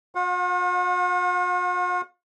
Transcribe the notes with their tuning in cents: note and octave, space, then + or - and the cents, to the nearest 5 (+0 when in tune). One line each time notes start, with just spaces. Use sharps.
F4 +45 F#5 -35